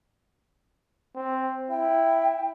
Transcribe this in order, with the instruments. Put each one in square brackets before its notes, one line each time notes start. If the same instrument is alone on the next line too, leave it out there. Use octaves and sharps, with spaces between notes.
[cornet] C4
[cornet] E4 [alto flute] G5